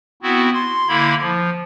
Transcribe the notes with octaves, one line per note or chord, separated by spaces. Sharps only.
B3 C4 E4 F#4
C6
D3 A#3 E4 B5 G#6
F3